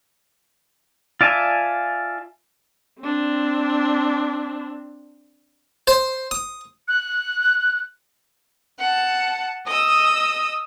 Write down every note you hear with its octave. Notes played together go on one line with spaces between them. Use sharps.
F4 D5 E5 G#5 A5
C4 D4
C5
D#6
F#6
F#5 A5
D#5 D#6 E6